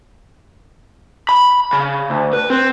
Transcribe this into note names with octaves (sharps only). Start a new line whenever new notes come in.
B5
C#3
D2
B4
C4